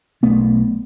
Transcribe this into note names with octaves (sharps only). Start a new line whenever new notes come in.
B1 A3 B3